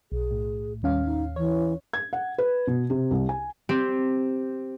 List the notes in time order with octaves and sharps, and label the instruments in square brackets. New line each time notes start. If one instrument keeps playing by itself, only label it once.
[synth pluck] B1 [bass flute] G#4
[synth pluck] A2
[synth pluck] D#2 C#4 F5 [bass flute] G3
[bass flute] D#4
[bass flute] E3 [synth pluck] C#5
[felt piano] G#6
F#5
B4
B2
C3
C2
G#5
[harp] C4 G4